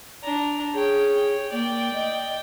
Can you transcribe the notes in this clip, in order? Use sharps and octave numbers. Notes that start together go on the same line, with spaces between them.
D4 A#5
G#4 C#5 G5
A#3 D5 G5
D#5